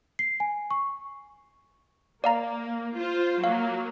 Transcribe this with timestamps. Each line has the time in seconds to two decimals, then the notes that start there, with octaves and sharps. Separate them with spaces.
0.19 C7
0.40 G#5
0.71 C#6
2.24 A#3 D5 F5 A#5
2.96 F4 C5
3.44 F#3 A#3 F5